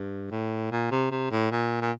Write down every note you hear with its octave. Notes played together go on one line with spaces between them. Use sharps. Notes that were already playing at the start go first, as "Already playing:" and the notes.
Already playing: G2
A2
A#2
C3
C3
A2
A#2
A#2